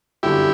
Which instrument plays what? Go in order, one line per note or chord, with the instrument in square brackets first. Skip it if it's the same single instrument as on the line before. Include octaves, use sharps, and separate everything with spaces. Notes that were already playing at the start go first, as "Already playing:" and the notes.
[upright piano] G1 F#2 D3 [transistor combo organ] E4 G4